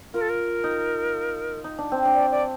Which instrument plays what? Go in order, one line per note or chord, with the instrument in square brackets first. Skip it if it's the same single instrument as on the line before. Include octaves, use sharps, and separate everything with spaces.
[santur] F4 [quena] A#4
[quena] A4
A#4
[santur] D#4
D#4
D4
C4
D4
[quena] D5
D5